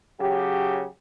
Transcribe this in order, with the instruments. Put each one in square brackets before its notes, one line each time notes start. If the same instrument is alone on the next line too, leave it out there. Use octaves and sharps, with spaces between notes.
[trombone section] C#3 F#3 G4